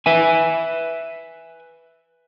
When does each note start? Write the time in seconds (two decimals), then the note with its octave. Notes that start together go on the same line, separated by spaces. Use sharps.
0.06 B4 E5 G#5